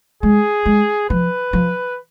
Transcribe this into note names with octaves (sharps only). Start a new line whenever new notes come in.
G#3 G#4
G#3
F3 B4
F3